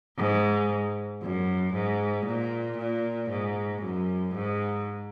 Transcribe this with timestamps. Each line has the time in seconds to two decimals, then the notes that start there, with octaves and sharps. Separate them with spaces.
0.17 G#2
1.22 F#2
1.74 G#2
2.25 A#2
2.78 A#2
3.30 G#2
3.82 F#2
4.34 G#2